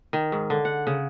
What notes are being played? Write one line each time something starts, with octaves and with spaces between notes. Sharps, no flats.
D#3
G#2
D3
F#5
C#3